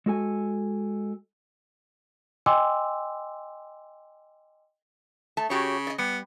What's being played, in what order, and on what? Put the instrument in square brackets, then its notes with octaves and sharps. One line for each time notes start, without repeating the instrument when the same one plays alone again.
[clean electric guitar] G#3 F#4 A4 G#5
[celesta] D#5 G5 G#5 C6 D6 E6
[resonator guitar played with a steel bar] A3 A5
[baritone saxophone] C#3 [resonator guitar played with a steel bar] F#4 G4 C#5
[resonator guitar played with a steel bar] D5 D#5
[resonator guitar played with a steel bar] G3 [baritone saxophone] B3